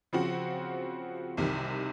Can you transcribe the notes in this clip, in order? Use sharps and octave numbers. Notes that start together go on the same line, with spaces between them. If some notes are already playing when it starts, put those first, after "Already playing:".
C#3 F3 C4 F#4
C2 C3 D#3